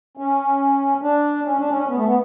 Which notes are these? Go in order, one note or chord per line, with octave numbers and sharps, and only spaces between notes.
C#4
D4
C#4
D4
C#4
B3
A3
B3